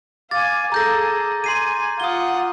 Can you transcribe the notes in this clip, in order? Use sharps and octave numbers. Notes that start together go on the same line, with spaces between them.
F5 G#5 D6 A6
G#4 A4 A#5 G6 A#6
G#5 C6 C7 D#7
F4 F#5 D#6 G7